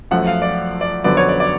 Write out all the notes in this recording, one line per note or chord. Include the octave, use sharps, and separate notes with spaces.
F#2 F3 A3 F#5
F5
D5
D5
F2 D3 F#3 B3 D5
C#5
D5
D5